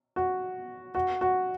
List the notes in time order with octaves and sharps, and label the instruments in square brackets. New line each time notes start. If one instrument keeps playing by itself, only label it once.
[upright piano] F#4
F#4
F#4